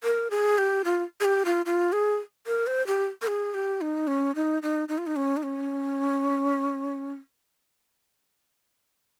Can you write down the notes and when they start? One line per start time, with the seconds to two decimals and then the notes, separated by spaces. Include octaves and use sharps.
0.04 A#4
0.31 G#4
0.58 G4
0.85 F4
1.21 G#4
1.25 G4
1.45 F4
1.66 F4
1.92 G#4
2.47 A#4
2.67 C5
2.87 G4
3.22 A#4
3.27 G#4
3.54 G4
3.81 D#4
4.07 C#4
4.35 D#4
4.63 D#4
4.89 D#4
4.98 F4
5.07 D#4
5.16 C#4
5.37 D#4
5.43 C#4